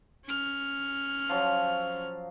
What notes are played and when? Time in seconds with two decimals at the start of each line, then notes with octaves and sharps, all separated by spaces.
0.25 C#4 F6
1.29 F3 F#3